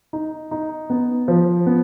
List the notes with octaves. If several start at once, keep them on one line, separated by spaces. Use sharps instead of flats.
D#4
D#4
B3
F3
B3